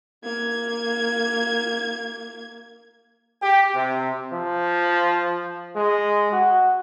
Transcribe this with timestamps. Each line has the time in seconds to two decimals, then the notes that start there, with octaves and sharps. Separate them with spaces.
0.24 A#3 G#6
3.42 G4
3.74 C3
4.33 F3
5.76 G#3
6.32 F#4